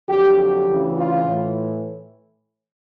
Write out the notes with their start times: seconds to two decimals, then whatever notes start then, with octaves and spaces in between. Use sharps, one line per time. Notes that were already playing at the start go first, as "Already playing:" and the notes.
0.08 F2 D3 F#3 G4
0.38 G4
0.66 D2 C#3 E3
0.95 F4
1.24 A2 E3